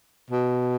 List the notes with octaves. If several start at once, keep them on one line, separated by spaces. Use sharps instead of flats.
B2